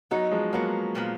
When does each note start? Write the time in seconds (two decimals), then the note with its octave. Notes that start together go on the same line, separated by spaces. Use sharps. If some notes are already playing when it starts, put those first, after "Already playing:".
0.11 F#3 B3 D#4 F#4
0.31 F3 G#3
0.53 F3 F#3 A#3 B3 F#4
0.95 A#2 F3 B3